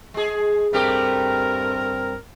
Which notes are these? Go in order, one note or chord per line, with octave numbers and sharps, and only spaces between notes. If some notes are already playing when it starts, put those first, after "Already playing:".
G#3 G#4
G2 A3 C4 G4 A#4